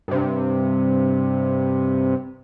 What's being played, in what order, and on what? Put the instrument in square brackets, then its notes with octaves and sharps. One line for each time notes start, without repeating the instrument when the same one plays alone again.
[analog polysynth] G2 C3